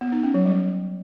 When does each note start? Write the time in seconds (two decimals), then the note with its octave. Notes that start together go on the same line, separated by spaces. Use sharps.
0.01 B3
0.12 D#4
0.23 C#4
0.34 F#3
0.45 G3